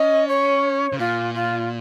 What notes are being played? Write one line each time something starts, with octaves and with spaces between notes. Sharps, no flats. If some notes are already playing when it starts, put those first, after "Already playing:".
Already playing: C#4 D#5
C#5
C#3
A#2 F4
F4